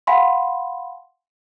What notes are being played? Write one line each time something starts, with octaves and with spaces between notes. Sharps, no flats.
F5 F#5 G#5 B5 C6